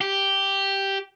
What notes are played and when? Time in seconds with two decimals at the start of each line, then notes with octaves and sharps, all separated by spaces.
0.01 G4